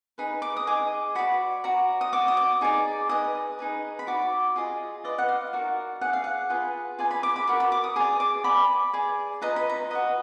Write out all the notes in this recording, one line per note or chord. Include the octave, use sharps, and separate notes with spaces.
D#4 G#4 B4 B5
D6
D#6
G#4 D#5 D6
F#4 D5 B5
F#4 D5 A#5
D#6
F#4 D5 D6
D#6
D6
D#4 G#4 D5
G#4 B4 D#5 D#6
D#4 G#4 B4
B5
F#4 D5 D6
F4 G#4 D#5
F4 B4 D5 D#5
F#5
F5
D#4 F#4 A#4 D5
G#4 D5 F#5
F5
F#5
F4 G#4 B4
F4 G#4 B4 D5 G#5
B5
D6
B5
F#4 A#4 D5 B5
B5
D6
D#6
G#4 D5 D6
D6
G#4 D5 B5
G#4 D5
F4 B4 D#5 A#5
B5
A#5
F#4 B4 D#5